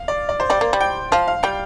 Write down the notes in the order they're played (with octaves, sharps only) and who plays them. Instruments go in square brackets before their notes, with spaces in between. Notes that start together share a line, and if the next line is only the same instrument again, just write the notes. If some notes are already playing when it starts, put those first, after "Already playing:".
Already playing: [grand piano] F5
D5
D5
C5
[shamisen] G3 [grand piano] D5
[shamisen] A#3
G3
[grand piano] G5
[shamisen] F3 [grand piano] F5
[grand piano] F5
[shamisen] G3 [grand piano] G5